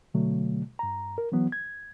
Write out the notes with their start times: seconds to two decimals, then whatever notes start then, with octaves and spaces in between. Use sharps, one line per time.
0.14 B2 D3 F#3 A3
0.79 G2 A#5
1.18 A#4
1.32 E3 F#3 B3
1.52 G#6